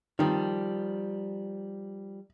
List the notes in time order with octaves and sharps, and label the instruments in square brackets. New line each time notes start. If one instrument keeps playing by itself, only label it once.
[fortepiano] D#3 [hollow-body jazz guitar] F3 G3